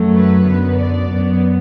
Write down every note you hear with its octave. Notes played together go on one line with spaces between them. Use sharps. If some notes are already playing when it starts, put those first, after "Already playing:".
Already playing: F#2 F#3 A3
B4
F#2 D3 B3
D5
F#2 F#3 B3